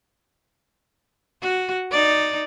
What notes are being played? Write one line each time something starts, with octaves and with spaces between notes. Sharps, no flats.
F#4
D#4 D5